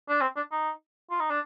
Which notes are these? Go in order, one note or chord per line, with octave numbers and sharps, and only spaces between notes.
D4
C4
D4
D#4
F4
D#4
D4